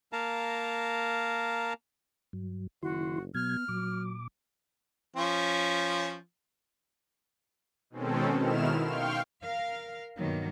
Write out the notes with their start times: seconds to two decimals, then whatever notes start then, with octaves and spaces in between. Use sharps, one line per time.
0.13 A#3 A#4 F5 A5 A#5
2.33 G2 F#3
2.83 F#1 D#3 E4 F#4 C6
3.35 B2 F#3 B3 F6 G#6
3.68 A#2 F#3 D6
5.16 F3 C#4
7.90 B2 D#3 G#3 C4 C#4 A4
8.40 B2 D#3 E4 F6 E7
8.82 F5 G5 C6 C#6 F6
9.43 A#4 F5
10.17 G2 B2 D#3 F#3 A#3